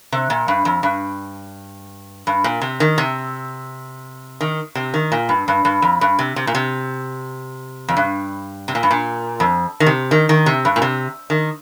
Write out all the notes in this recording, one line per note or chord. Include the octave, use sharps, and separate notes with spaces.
C3
A#2
G2
F2
G2
G2
A#2
C3
D#3
C3
D#3
C3
D#3
A#2
G2
G2
G2
F2
G2
C3
C3
A#2
C3
F2
G2
C3
A#2
G2
A#2
F2
D#3
C3
D#3
D#3
C3
G2
A#2
C3
D#3